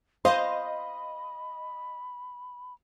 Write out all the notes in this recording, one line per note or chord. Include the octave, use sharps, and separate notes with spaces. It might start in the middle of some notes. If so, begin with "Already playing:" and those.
C5 D#5 F5 B5